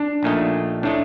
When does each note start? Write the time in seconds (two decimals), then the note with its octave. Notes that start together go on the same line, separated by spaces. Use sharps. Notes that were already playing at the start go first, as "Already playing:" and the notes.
Already playing: D4
0.23 A#1 A#2 A3 D#4
0.83 A2 A3 D4 D#4